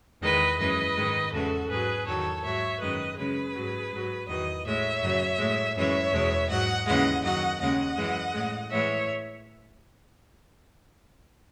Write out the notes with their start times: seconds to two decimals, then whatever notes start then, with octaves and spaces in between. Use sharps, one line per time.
0.21 E2 D#3 G#3 B4 D#5
0.58 F#2 E3 G#3 B4 D#5
0.96 G#2 D#3 G#3
1.32 E2 C#3 E3 G#3 F#4 A4
1.69 G#2 F#3 G#4 B4
2.06 E2 D#3 F#3 A4 C#5
2.43 G#2 F#3 C#5 E5
2.80 F#2 D#3 G#3 B4 D#5
3.17 F#2 C#3 G#3 G#4 B4
3.54 G#2 F#3
3.91 G#2 F#3
4.27 E2 D#3 F#3 B4 D#5
4.64 A2 G#3 C#5 E5
5.02 F#2 C#3 F#3
5.38 A2 G#3
5.76 F#2 E3 G#3 C#5 E5
6.12 E2 B2 G#3
6.49 G#2 F#3 D#5 F#5
6.86 D#2 C#3 E3 G#3 D#5 F#5
7.23 F#2 D#3 F#3 D#5 F#5
7.60 D#2 C#3 G#3 D#5 F#5
7.97 F#2 E3 G#3
8.34 A2 G#3
8.71 A2 E3 G#3 C#5 E5